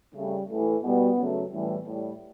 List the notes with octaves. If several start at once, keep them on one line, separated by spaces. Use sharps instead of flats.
C#3 G3 A3
A2 E3 A3
B2 G3 B3
C#3 F#3 A3
A2 E3 G3
A2 G3